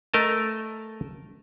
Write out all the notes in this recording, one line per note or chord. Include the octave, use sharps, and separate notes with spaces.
A3 A#4 D#5 A5